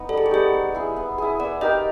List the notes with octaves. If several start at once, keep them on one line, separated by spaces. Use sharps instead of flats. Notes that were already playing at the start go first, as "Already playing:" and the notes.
Already playing: B3 D#4
G3 A4
G#4
G4
B3 D#4 G#4
B3
E4 G#4
B3
E4 G#4
B3 D5
D#4 G4 A#4 D#5